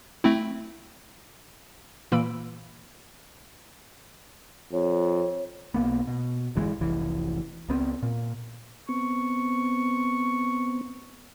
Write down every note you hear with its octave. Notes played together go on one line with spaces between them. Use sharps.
A3 C4 E4
A#2 E3 A#3 B5 E6 D7
F2 C#5
B1 F#2 A#3 B3
B2
D1 G1 E3 G#3
F1 C2 E3
C#2 B3 C4
A#2
B3 C4 C#6